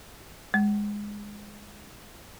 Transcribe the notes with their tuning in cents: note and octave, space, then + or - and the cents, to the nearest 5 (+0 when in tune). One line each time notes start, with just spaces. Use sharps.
G#3 -10